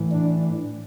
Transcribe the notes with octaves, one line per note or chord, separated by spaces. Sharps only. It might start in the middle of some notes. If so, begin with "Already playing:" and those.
Already playing: A2 E3
D4